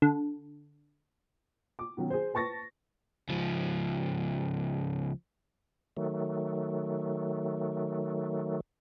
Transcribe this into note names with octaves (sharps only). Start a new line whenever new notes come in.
D3
D6
B2 D#3 F#3 C#4
G#4 C5
B4 A5 C#6 A6 A#6
C#2 F3
D#3 F#3 A3